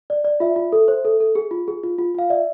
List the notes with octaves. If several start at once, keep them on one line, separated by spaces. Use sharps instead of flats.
D5
D5
F4 E5
F4
A4
C5
A4
A4
G#4
F4
G#4
F4
F4
F4 F5
D5 E5